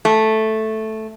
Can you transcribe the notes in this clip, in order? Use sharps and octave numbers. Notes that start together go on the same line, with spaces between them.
A3